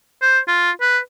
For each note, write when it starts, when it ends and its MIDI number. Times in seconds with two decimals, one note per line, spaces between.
0.21 0.39 72
0.47 0.71 65
0.81 0.98 71